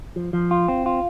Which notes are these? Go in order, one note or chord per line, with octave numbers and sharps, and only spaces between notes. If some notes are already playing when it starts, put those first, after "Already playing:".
F3
F3
F4
C4
F4